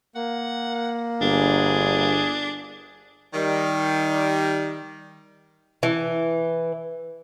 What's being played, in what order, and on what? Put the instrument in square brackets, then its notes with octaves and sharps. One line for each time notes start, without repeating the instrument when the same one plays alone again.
[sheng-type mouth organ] A#3 [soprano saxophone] F#5
[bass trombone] G1 [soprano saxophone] D4 [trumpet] G#4
[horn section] D#3 G3
[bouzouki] E3